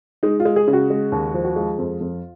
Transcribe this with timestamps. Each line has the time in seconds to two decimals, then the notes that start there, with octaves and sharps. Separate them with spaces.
0.23 G#3 D#4
0.40 F4
0.45 G#3
0.56 G#4
0.68 C#3
0.73 F#4
0.90 G#3
1.12 D#2
1.34 F3
1.44 F#4
1.56 G#3 F4
1.78 F2
2.00 F2